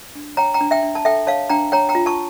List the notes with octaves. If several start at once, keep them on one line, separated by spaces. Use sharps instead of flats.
D4
C#5 G5 A#5
G5 A#5
D4
E5 G5
D4
A5
A4 E5 G5
C#5 F5 A5
D4 G5 A#5
C#5 G5 A#5
G5 A#5
F4
A5 C#6